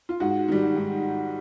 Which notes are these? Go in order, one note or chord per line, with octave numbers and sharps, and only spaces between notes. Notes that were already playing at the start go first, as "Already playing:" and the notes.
F4
G#2 F#4
D#3 G3
G#2